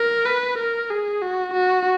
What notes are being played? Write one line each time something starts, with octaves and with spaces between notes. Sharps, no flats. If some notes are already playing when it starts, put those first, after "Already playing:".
Already playing: A#4
B4
A#4
G#4
F#4
F#4